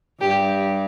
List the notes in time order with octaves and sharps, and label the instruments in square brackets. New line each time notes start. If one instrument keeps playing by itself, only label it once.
[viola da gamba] G2 [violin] G4